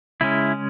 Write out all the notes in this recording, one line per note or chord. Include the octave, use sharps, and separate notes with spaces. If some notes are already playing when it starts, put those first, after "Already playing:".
C#3 G#3 C#4 E4